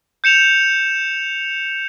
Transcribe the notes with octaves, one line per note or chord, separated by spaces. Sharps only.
G6 C#7 E7 F7